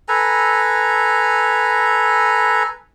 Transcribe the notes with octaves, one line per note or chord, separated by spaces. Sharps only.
A4 B4 G#5 A#5